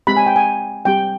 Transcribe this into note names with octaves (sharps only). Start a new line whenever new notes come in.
G#3 C4 G4 B5
G#5
G5
G#5
G3 C4 G4 G5